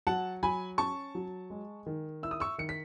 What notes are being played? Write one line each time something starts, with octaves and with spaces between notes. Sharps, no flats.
F#3 F#5 A5
F#3 G#5 B5
C#4 A5 C#6
F#3
G#3
D#3
E4 E6
D#6
C#6 E6
D#3 C#7
B6